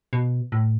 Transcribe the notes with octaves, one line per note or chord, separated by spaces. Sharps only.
B2
A2